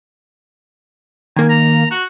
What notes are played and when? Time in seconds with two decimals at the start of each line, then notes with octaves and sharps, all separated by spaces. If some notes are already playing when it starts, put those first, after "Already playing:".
1.36 D#3 A#3 G#5
1.49 A#5
1.91 F#4